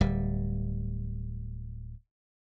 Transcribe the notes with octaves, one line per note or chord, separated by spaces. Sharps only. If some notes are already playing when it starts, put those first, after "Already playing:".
D1 G3